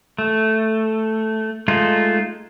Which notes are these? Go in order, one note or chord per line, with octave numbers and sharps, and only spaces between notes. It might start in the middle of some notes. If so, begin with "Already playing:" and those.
A3
G#3 A3 D#4 F4